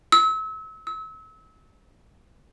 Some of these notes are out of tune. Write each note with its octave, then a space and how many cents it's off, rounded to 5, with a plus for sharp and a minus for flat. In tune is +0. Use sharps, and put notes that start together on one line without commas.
E6 -35
E6 -35